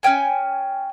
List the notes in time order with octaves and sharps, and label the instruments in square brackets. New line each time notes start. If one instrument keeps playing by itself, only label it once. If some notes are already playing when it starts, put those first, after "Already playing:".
[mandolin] C#4 C#5 G5 G#5